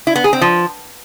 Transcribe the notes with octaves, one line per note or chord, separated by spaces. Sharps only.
E4
B3
G#4
C4
F3